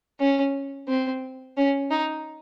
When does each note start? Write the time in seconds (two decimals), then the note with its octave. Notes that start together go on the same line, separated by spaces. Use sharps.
0.20 C#4
0.88 C4
1.57 C#4
1.91 D#4